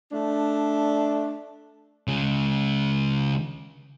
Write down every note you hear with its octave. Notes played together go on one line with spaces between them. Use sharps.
A3 D4
C#3 G#3